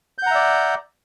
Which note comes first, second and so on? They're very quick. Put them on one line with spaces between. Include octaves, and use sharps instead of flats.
G6 F#5 A#5 E5 D5